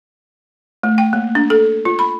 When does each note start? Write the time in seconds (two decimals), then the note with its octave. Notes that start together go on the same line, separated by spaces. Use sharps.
0.83 A3
0.98 G5
1.13 A#3
1.35 D4
1.50 A4
1.85 F4
1.99 B5